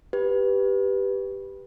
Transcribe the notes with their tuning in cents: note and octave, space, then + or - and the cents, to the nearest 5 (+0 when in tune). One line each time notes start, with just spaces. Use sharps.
G4 +0 B4 -5